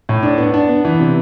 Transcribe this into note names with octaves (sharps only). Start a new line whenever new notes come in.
A2
D4
B3
D4
B3
E3
C3